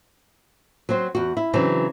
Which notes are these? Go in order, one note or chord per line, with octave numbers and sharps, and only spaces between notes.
F#3 C4 F#4 C5
E2 F#4
E4
C#3 E3 F#3 C4 D4